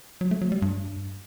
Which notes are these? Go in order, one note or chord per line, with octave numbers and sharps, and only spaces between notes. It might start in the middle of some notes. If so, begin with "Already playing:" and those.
F#3
A3
F#3
G3
G2